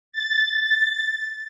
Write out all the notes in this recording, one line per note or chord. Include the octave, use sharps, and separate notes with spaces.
A6